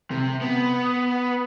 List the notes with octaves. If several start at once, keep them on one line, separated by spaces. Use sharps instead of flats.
C3
B3